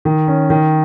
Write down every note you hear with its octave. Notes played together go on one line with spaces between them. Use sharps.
D#3
C#4
D#3